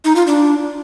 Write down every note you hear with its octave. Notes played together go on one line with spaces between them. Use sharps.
D#4
F4
D4